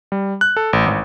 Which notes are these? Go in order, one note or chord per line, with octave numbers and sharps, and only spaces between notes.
G3
F#6
A4
A1
G#1